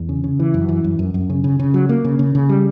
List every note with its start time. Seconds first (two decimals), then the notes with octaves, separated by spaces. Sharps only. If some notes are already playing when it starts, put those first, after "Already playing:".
Already playing: E2
0.09 C#3
0.24 C#3
0.40 E3
0.54 F#2
0.69 E3
0.84 F#2
0.99 F#2
1.14 F#2
1.30 C#3
1.44 C#3
1.59 C#3
1.74 F#3
1.89 A#3
2.05 C#3
2.19 C#3
2.35 C#3
2.49 G3